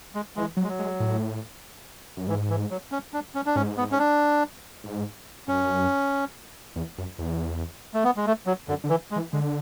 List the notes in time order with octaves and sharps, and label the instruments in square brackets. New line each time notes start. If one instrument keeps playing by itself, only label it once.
[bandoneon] G#3
[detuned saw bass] E3 [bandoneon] G#3
[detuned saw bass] F#3
[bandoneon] G#3
F#3
[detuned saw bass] G#3
A2
F#2
[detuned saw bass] G#2 [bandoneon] E3
[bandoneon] E3
F#3
C#4
D4
C#4
D4
[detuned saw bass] G#2 [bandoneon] C#4
[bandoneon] B3
C#4
D4
[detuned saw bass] G#2
[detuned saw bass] F#2 [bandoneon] C#4
[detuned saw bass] E2
F#2
E2
[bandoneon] A3
B3
G#3
A3
F#3
[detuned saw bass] F#2 [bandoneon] D3
[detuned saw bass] D3
[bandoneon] E3
G#3
[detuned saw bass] E3
[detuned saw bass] D3 [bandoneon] G#3